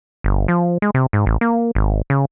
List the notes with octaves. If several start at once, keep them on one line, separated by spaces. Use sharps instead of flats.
G1
F3
G#3
C3
G#2
A1
A#3
G#1
C#3